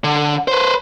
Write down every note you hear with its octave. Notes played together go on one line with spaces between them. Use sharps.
D3
B4 C5